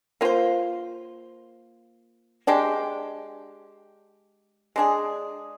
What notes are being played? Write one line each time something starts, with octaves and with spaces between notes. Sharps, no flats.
A#3 F4 C5
G#3 D4 G4
G#3 D4 G#4